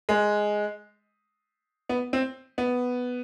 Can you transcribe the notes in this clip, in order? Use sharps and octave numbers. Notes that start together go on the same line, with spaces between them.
G#3
B3
C4
B3